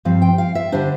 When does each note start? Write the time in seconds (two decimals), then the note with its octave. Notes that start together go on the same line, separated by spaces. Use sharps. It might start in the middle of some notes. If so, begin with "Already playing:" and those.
0.05 G2 F3 C4 F5
0.22 G5
0.38 F5
0.55 E5
0.72 D3 G3 D4 C5